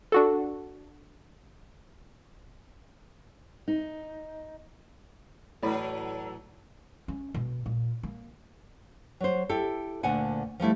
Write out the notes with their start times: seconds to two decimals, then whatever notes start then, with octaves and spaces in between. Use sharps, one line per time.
0.12 D4 F#4 A4
3.68 D#4
5.63 A2 E3 F#3 A4 B4 C#5 D5 B5
7.08 C#4
7.34 B2
7.66 A#2
8.03 A#3
9.20 F#3 C5
9.50 E4 G4 A4
10.03 D2 A#2 D3 F#5 G#5
10.60 F3 G3 A3 E4